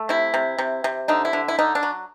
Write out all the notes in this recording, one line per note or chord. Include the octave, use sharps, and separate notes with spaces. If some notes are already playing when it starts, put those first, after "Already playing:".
Already playing: A3
C3 E4
C3
C3
C3
D3 D#4
E4
D3
E4
D3 D#4
D4
F#3